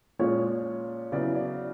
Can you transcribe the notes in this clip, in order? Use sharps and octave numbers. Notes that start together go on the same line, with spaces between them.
A#2 F3 G#3 C#4 C#5
C#3 F#3 B3 E4 D5
D5